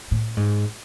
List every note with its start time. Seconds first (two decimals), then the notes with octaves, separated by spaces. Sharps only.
0.11 A2
0.37 G#2